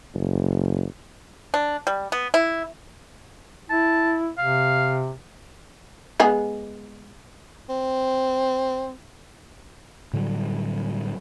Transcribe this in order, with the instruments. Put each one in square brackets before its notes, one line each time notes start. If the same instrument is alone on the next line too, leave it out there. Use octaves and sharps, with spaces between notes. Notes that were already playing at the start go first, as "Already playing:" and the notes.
[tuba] F#1
[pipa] D4
G3
B3
E4
[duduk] E4 [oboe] A5
[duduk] C3 [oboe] F5
[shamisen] G#3 B3 G#4
[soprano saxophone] C4
[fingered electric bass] A2 D3 F#3 G3